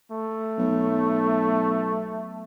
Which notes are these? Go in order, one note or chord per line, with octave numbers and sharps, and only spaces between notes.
A3
B1